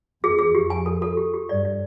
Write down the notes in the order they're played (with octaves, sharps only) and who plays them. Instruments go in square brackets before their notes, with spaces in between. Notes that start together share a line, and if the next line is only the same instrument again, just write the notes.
[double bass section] E2 [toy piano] G#4
[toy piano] G#4
[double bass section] F2 [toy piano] G4
[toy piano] G#5
A4
A4
G4
G4
[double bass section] G2 [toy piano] D5
[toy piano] D5